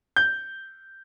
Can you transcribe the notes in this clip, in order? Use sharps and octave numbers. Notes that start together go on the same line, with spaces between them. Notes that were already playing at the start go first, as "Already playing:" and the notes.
G6